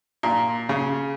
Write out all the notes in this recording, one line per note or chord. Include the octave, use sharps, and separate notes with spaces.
A#2
C#3